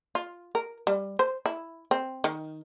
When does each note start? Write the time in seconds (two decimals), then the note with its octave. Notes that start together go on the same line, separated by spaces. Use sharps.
0.15 F4
0.55 A#4
0.87 G3
1.19 C5
1.46 E4
1.91 C4
2.24 D#3